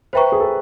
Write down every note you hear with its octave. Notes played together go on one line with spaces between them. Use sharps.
B4 C5 E5 G5 A#5 C#6
G#4
A4